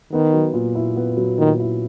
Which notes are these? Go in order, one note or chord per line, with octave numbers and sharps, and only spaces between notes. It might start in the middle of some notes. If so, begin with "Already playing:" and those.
D#3 B3
F#3
A#2
E4
B3
F#3
A#2 D#3
E4